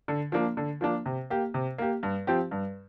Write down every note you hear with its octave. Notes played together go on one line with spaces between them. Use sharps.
D3
F3 A#3 D4
D3
F3 A#3 D4
C3
A#3 G4
C3
A#3 G4
G2
F3 C4 G4
G2